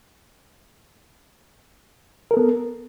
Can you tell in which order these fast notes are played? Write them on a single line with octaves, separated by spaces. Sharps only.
A#4 A4 B3